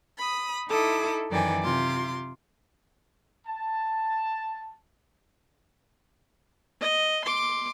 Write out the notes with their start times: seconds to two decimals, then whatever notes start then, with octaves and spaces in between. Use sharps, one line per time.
0.18 B5 D#6
0.70 D#4 E4 A4 D6 D#6
1.30 F#2 D#3 E3 D5 G5 G#5
1.63 C3 F4 C6 D6
3.47 A5
6.81 D#5
7.25 C6 D6